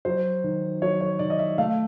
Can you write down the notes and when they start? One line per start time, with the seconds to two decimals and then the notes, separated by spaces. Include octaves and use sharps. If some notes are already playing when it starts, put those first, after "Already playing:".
0.05 F#3 C5
0.44 D#3
0.82 F#3 C#5
1.01 C#5
1.19 D#3 D5
1.30 D#5
1.39 E5
1.58 A3 F5